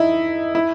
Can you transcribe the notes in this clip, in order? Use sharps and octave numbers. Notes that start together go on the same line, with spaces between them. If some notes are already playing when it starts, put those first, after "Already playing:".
Already playing: D#4 E4
E4